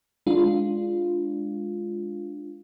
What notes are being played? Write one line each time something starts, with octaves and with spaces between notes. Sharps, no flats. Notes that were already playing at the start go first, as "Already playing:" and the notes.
G#3 D4 F4